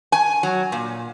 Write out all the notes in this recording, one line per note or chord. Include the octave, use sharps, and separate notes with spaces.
G#5
F#3
A#2